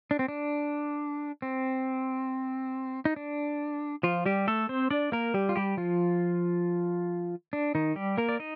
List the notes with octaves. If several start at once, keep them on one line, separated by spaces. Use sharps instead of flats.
D4
C4
D4
C4
D#4
D4
F3 F4
G3 G4
A3 A4
C4 C5
D4 D5
A#3 A#4
G3 G4
F4
G3 G4
F3 F4
D4
D#3 D#4
G3 G4
A#3 A#4
D5
D#4 D#5